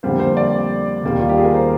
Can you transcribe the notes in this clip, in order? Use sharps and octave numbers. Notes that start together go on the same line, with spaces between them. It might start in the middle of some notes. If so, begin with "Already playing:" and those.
F2 D3 G3 A#3 C5
C5
D5
D#2 D#3 G3 A#3
F4
G4
G#4
A#4
C5